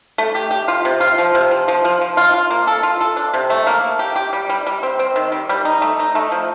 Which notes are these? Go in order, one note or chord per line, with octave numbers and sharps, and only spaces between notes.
A3
G4
G4
F4
C3
F4
F3
C3
F3
F3
F3
F3
F4
F4
A#3
A4
F4
A4
D4
C3
A3
A#3
A#3
G4
G4
G3
G3
G3
C4
C4
D#3
G3
G3
D#4
A3
D#4
A3
F3